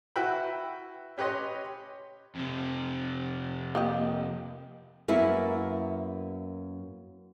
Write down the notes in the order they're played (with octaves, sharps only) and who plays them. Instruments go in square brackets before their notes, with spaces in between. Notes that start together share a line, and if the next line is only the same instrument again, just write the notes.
[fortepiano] E4 F#4 B4 E5 G5 B5
C#4 G4 B4 C#5 D#5 C6
[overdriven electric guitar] F2 C3
[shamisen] A#3 G4 D#5
[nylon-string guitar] F#2 A#3 B3 E4